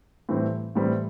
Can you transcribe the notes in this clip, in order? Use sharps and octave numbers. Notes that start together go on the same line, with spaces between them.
A2 E3 G3 C4
A2 E3 G3 C4